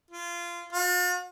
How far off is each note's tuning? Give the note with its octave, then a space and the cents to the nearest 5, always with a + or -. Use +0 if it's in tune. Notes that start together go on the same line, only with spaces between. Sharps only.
F4 -20
F4 +45